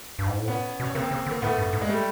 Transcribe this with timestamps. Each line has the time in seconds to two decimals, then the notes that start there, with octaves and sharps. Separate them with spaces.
0.19 G2
0.28 G#2
0.38 A2
0.48 A#2 B3 C#4
0.80 B2
0.83 C#4
0.95 C#3 A#3 C4
1.11 C#3
1.26 D3
1.31 A#3
1.42 A2 A3 B3
1.58 G2
1.73 G#2
1.82 G#3
1.89 G3 A3